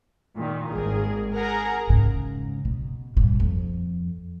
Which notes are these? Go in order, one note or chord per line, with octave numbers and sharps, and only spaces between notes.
A#2 D#3
G#1 G#2 G#4 A#4
G#4 A#4 F#5 G#5 A#5
G#2 C#3
B2
G2 A#2
F2